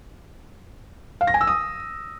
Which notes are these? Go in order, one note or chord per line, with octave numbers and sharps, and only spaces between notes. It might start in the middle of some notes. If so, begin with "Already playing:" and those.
F5
A#6
G#5
E6
D#6